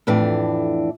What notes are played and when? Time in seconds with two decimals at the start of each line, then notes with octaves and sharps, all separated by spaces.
0.07 F2 A2 E3 D4